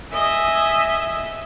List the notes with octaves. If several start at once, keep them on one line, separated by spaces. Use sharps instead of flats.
D#5 E5 G#5